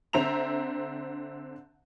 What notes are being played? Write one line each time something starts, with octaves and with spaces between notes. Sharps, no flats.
D3 C4 E5 A#5 F7